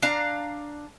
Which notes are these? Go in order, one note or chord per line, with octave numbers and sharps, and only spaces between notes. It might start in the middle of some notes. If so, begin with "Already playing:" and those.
D4 F5 A#5